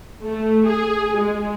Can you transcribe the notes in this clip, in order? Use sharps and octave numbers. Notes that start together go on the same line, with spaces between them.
A3
G#4
G#3